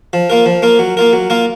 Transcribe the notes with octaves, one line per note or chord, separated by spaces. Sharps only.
F3
A#3 F4 A#4
F3
A#3 F4 A#4
F#3
A#3 F4 A#4
F#3
A#3 F4 A#4